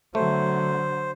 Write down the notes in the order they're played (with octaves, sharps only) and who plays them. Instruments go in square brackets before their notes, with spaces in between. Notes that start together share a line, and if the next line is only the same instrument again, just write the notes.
[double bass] D3 F#3 [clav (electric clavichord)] A3 [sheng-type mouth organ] C5